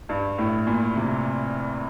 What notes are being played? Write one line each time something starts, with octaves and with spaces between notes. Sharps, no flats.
G2
A2
A#2
C3